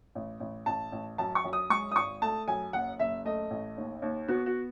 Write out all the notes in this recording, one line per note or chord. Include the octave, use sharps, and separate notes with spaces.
A1
A1
A1 A5
A1
F#2 A5
C#6
F#2
D#6
G#3 C#6
D#6
G#1 C#6
A3 A5
F#2 G#5
F#1 F#5
F#1 E5
A3 D#5
A1
D#2
D#2
B3 F#4
F#4